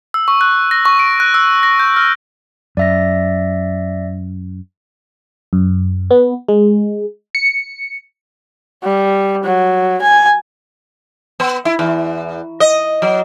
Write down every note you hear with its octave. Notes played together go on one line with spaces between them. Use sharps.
E6
C#6
F#6
A#6
C#6
D7
F#6
E6
A#6
G6
F6
F#2 D5 E5 A#6
F#2
B3
G#3
C#7
G3
F#3
G#5
B3
E4
E2
D#5
F#3